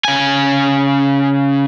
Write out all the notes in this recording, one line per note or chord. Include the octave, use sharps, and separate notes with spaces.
C#3 G#5